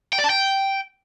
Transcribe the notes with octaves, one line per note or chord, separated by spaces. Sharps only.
G5
D5
A5
G5